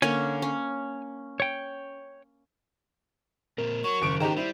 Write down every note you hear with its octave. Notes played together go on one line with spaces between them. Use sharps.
D3 A#3 C#4 C#5 G#5
C#4
C#5 G5
A#2 C4 A#4
F#4 C#5 C#6
F#1 D#3 F3 D7
D#2 D#3 G4 C5 A#5
G3 E4 C5